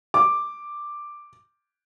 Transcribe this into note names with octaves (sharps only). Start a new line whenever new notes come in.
D6